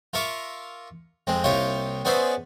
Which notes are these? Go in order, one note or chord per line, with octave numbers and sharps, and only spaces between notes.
F4 A#4 E5 C#6 D6
F2 G#3 C4
C2 A#3 D#4 F4 G4 C#5
B3 C#4 G#4 C5 D5 E5